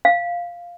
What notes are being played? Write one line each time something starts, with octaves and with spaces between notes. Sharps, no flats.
F5